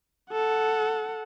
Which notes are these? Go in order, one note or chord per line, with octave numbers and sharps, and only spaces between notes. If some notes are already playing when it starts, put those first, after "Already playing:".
A4 F#5